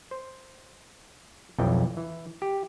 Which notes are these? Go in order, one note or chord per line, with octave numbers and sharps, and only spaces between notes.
C5
B1 F2 E3 G5
E3
G4